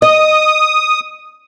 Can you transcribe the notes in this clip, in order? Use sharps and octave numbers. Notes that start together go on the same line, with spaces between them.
D#5 D#6